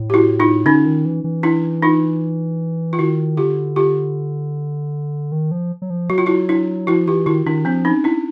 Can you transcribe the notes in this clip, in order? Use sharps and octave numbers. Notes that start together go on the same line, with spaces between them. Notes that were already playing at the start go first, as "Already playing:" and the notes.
Already playing: A2
G4
E4 F#4
D#4 F4
D3 C#4 D#4
D#3
E3
E3
D4 E4
D#4 F4
F4
D#3 E4 F#4
D3 F4 G4
F4 G4
D#3
F3
F#3
F3
F#3 F#4
F4
E4 F#4
D4 E4
F3 E4 F#4
E3 F4 G4
D#3 E4 F#4
D#3 D4 E4
F3 C4 D4
C#4 D#4
D4 E4